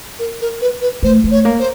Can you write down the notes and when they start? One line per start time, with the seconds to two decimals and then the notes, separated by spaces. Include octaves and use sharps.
0.19 A#4
0.41 A#4
0.61 B4
0.81 B4
1.03 A3 C5
1.24 A3
1.31 C#5
1.45 A#3
1.59 C5